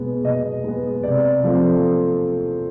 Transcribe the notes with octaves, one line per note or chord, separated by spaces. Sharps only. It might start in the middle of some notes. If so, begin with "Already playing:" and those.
Already playing: B2 G#3 B3
B2 D#5
G#3 B3
C3 D5
F3 A3 C4